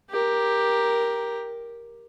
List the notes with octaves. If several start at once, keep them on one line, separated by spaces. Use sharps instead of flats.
G4 A#4